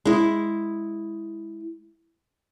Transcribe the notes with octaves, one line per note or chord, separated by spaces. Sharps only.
G#3 E4